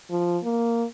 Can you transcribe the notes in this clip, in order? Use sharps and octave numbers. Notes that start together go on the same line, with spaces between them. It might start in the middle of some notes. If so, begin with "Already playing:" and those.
F3
A#3